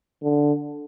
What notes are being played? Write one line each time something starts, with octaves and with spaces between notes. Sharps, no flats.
D3